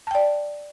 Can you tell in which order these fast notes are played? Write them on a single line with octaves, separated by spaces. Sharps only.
A5 G5 D5